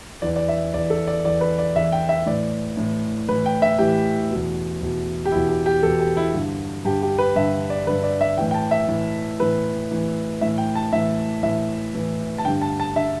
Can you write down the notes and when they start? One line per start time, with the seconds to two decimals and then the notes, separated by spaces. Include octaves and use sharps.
0.22 E2 E3 D5
0.36 D5
0.48 E5
0.74 E2 E3 D5
0.90 A4
1.08 D5
1.24 E2 E3 D5
1.41 B4
1.59 D5
1.75 E2 E3 E5
1.92 G5
2.09 E5
2.26 A2 E3 D5
2.77 A2 E3
3.29 A2 E3 B4
3.46 G5
3.62 E5
3.79 A2 E3 G4
4.30 E2 B2
4.82 E2 B2
5.25 G4
5.32 E2 B2 E4
5.49 G4
5.66 G4
5.82 E2 B2 A4
6.00 G4
6.17 E4
6.34 G2 D3
6.85 G2 G4
6.88 D3
7.02 G4
7.18 B4
7.36 G2 D3 E5
7.70 D5
7.86 D3 B4
7.91 G2
8.03 D5
8.21 E5
8.38 A2 E3 G5
8.51 G5
8.54 A5
8.71 E5
8.88 A2 E3
9.39 A2 E3 B4
9.91 A2 E3
10.41 A2 E3 E5
10.58 G5
10.75 A5
10.92 A2 E3 E5
11.43 A2 E3 E5
11.95 A2 E3
12.38 A5
12.45 D3 G5
12.48 G2
12.62 A5
12.80 A5
12.96 D3 E5